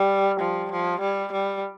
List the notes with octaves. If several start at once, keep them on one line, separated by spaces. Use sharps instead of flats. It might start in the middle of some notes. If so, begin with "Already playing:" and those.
Already playing: G3
F3
F3
G3
G3